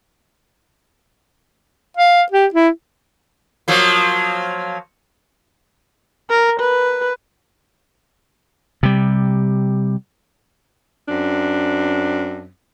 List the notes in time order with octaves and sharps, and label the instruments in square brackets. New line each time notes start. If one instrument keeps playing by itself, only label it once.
[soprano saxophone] F5
G4
E4
[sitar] F3 F#3 A#3
[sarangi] A#4
B4
[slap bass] C3 G3
[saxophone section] F#2 C4 D4